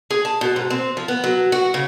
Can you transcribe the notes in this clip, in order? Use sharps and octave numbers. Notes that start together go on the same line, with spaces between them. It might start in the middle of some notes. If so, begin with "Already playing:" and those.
G#4
A5
B2
G#2
C4
F3
B3
F#3
F#4
C#3